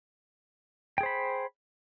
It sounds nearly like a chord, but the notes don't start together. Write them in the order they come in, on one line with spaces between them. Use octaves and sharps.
G5 G#4 C5 B5